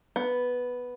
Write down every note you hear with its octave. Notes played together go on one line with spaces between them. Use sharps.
B3